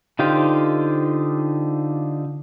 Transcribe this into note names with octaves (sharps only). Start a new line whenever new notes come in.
D3 D#4 F4 G4 C5